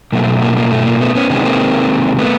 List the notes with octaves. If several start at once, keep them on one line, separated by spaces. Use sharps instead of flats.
B2 F#3 A3 A#3
A#3
A#3
A3
A#3
A3 B3
B3 C#4
C3 D#3 G#3 B3 C#4
A#3 C4
A3 B3